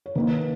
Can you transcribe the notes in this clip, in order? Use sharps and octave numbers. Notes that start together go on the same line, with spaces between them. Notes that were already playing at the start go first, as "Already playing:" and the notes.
C#5
D#3 A#3 D#4 B4